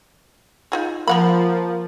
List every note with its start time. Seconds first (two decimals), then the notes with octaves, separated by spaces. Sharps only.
0.72 D#4 F4 G#4
1.08 F3 A#3 A#4 F#5 B5